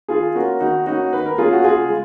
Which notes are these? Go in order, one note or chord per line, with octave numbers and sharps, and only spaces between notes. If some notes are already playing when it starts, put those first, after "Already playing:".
D#3 F4 G#4
A#3 C#4 F#4 A#4
D#3 D#4 F#4
A#3 C#4 D#4 F#4
D#3 B4
A#4
A#3 C#4 F4 G#4
F#4
C#3 F4 G#4
G#3